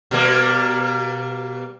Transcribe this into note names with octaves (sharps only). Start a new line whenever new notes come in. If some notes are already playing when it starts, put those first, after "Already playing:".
B2 G3 A#3